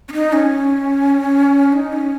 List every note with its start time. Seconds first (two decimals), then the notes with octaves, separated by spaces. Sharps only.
0.09 C#4
0.13 D#4
0.33 C#4
1.73 D#4
1.93 C#4